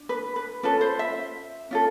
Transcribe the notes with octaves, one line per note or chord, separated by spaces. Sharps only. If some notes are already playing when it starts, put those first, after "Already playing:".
Already playing: D4
B4
B4
C#4 F4 A4 B4
C5
E5
C#4 F4 A4